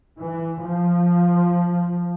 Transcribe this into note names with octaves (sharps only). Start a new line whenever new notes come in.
E3
F3